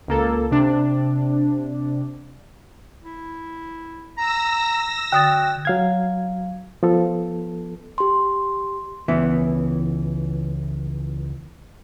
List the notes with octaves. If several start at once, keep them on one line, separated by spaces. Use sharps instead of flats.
C#2 A#3 A4
C3 D4
E4
A#5 E6 A#6
D3 F#4 G5 D#6 F#6 A6
F#3 F5 G#6
F3 B3 A4
G4 C6
C#2 E3 B3 E5